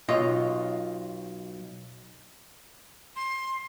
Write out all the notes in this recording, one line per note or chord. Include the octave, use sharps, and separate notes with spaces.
B1 F4 C#5 D#5
C6